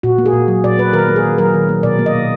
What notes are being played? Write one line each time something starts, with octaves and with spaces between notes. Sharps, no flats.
A#2 F#4
A#3
G#4
A#2
F#3
A#2 D5
A#3 B4
D#3 A#4
A#3
G#4
D#3
F#3 A#4
D#3
A#3
B2 D5
A#3
D#5
B2